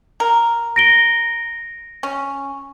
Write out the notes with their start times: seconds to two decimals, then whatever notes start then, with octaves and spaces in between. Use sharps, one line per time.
0.20 A#4
0.76 A#6 D7 G7
2.03 C#4